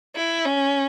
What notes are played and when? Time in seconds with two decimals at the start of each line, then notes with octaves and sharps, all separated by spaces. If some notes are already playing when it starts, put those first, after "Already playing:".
0.16 E4
0.45 C#4